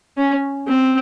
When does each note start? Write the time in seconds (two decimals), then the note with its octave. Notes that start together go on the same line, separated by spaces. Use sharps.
0.17 C#4
0.67 C4